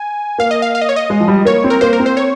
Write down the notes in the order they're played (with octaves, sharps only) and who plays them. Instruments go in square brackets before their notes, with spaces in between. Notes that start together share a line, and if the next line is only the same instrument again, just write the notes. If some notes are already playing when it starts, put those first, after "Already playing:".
Already playing: [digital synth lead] G#5
[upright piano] A#3 [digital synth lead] F5
[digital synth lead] D#5
F5
F5
D#5
C#5
D#5
[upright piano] G#3
F3
G3
[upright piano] A#3 [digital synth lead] C#5
[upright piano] C4
[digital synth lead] A#4
[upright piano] A#3 [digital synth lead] C5
[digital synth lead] A#4
[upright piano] C4
[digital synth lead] C5
C#5